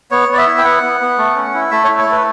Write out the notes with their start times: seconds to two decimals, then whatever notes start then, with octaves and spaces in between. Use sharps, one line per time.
0.11 B3 C#5
0.29 B3 D5
0.38 E5
0.47 E4
0.58 G5
0.65 B3 F#5
0.82 B3
1.01 B3
1.18 A3
1.36 C#4
1.54 E4
1.71 A3 E5
1.84 E4 C#5
1.98 C#5
2.07 A3 B4